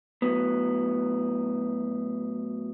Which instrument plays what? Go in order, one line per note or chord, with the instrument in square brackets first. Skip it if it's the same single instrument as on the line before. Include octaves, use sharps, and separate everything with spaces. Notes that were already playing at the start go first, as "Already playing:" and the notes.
[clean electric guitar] A2 F#3 B3